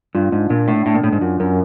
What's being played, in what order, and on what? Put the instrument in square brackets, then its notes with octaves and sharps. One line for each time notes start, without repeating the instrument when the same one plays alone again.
[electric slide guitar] G2 [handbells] F4
[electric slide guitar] G#2 [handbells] D4
[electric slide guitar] A#2 [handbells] D4
[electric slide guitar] A2 [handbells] D4
[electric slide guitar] A2 [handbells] D4
[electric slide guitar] A#2
[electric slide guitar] A2 [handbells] D4
[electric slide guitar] G#2
[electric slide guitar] F#2 [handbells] F4
[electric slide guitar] F#2 [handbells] A#4